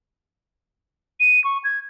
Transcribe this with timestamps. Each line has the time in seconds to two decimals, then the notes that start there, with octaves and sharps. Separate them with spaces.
1.20 D#7
1.44 C#6
1.64 G#6